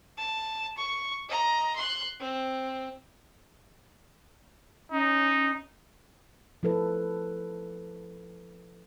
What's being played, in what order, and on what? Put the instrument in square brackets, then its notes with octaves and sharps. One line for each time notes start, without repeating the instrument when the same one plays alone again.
[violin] A5
C#6
D#5 A#5
C6 F#6
C4
[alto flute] C#4 [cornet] D#4
[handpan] F3 E4 A4 B4